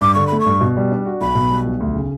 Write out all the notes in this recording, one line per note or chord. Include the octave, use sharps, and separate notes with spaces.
G2 D6
D3 C#6
A3 B5
C#6
G2
B2
G3
D4
F#4
B1 B5
B2
G3
B1
D2
C#3